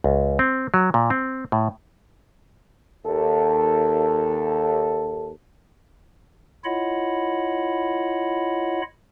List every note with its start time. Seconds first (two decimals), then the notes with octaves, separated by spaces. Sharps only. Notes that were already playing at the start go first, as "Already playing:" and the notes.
0.04 C#2
0.39 C4
0.74 F#3
0.94 A#2
1.10 C4
1.52 A2
3.06 D#2 A4
6.65 E4 F4 C#5 D#5 F#5 B5